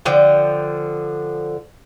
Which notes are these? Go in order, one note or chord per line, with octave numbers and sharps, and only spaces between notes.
D3 F3 G5